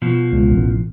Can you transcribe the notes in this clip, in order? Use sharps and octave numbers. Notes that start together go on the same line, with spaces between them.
B2 F3
C#2
A1